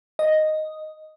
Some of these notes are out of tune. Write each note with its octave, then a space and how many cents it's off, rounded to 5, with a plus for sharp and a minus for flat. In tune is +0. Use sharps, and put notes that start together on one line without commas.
D#5 +0